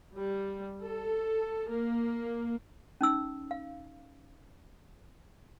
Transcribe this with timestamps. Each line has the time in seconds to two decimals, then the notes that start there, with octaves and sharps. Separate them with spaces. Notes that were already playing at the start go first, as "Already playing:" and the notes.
0.14 G3
0.83 A4
1.70 A#3
3.01 C#4 D#4 E6
3.51 F5